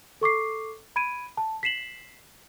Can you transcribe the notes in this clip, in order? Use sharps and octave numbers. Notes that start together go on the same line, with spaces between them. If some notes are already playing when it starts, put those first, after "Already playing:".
A4 C#6 D6 C7
B5 G#6 D7 D#7
A5
B6 C7 E7 F#7